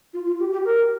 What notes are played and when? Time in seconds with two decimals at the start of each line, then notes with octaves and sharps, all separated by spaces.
0.13 F4
0.26 F4
0.39 G4
0.52 G4
0.65 A#4